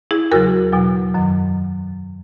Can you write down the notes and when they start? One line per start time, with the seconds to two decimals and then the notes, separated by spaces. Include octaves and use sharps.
0.11 E4 G#4
0.31 E2 C#3 F#3 F#4 A#4
0.72 E2 B2 F#3
1.14 F#2 D#3 F#3